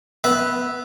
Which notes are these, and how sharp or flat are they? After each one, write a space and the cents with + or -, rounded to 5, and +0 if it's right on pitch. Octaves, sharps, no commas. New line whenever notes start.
B3 +0 E5 -15